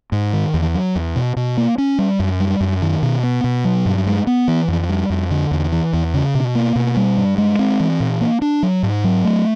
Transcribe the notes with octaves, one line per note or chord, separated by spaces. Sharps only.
G#2
D#3
E2
F#3
E2
B2
B2
A#3
C#4
G3
F#2
G3
F#2
D#3
B2
B3
B2
F#3
G2
G#3
B3
E3
F2
G3
F2
D3
E2
E3
E2
C#3
B2
A#3
B2
G3
G2
G#3
C4
E3
A#2
A#3
D4
F#3
G#2
F#3
A3